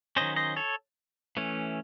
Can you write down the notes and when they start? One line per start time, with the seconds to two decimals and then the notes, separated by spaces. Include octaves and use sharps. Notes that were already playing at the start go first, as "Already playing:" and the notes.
0.16 D#3 F#3 C#4 C5 D#5
0.36 C5 D#5
0.56 A4 C#5
1.37 E3 A3 C#4